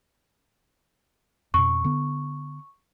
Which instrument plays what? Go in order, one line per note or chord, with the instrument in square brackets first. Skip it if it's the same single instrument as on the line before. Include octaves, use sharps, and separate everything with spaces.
[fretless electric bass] F2 B2 [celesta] C#6
[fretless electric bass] D3 B3